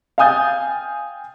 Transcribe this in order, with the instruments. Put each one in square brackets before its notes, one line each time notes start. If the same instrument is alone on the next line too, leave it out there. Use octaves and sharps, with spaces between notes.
[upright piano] F5 G5 G#5 D#6 G6 A6